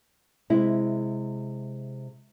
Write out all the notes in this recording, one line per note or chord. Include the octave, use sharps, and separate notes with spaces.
C3 G#3 E4